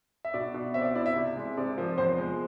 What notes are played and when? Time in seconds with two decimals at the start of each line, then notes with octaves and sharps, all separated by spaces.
0.25 E5
0.34 B2 D5
0.54 B2
0.74 C4 E5
0.81 D5
0.85 E5
0.95 E4 D5
1.06 E5
1.16 C3
1.36 G#3
1.57 C3 D5
1.78 F3
1.98 E2 C5
2.18 G#3